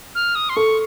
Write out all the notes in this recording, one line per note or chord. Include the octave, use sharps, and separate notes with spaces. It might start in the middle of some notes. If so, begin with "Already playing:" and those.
F6
D#6
C6
A4 C#6